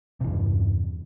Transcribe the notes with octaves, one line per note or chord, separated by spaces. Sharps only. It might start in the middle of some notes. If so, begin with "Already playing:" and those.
E2 G2 C3 E3